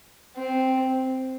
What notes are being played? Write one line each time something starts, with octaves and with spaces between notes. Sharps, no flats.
C4